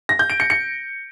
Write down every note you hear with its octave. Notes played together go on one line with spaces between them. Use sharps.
A#6
G6
D7
C#7
C#7